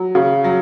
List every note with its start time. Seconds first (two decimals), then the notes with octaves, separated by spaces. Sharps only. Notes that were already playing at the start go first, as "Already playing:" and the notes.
Already playing: F#3
0.15 C#3
0.44 F#3